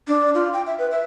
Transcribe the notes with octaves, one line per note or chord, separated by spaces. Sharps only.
D4
F4
G5
E5
B4
E5